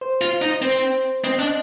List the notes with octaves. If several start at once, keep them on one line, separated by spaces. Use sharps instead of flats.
C5
F4
D#4
C4 C5
C4 D#5
D4